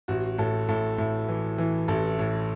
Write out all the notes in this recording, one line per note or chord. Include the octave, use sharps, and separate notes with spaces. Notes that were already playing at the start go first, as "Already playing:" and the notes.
A1 F#4
A2 A4
A2 A4
A2
E3
E3
A1 A4
A2